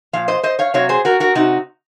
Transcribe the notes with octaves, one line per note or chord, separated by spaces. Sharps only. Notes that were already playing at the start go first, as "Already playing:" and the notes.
A#2 F3 F5
C5 D#5
C5 D#5
C#5 F5
C3 F#3 C#5 F5
G#4 C5
F#4 A#4
F#4 A#4
C3 D#4 F#4